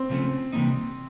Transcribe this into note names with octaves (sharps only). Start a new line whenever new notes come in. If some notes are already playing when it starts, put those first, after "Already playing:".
Already playing: C4
C#3 F3 A3 C#4
C3 E3 G3 A#3 D#4